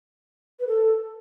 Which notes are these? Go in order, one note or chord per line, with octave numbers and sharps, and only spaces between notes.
B4
A4